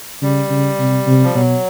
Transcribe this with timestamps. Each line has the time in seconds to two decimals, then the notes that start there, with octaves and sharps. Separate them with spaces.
0.22 C#3 G3
0.50 C#3
0.79 C3
1.07 C3
1.24 F3
1.35 B2 F#3